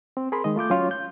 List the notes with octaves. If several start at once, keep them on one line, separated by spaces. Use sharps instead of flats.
C4
G#4 A#4 B5 C6
D#3 G#3 D#5
A3 F4 D6 G6
F#3 C#4 F4 C#5
G6